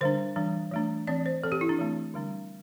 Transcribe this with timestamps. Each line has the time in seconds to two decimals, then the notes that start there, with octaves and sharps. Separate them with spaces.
0.01 D3 G3 D4 C5
0.36 E3 G3 D4
0.72 E3 A3 D4
1.07 E3 C4 D5
1.26 C5
1.44 E3 C4 A4
1.52 G4
1.61 E4
1.69 D4
1.79 E3 A3 C4
2.14 D3 G3 D4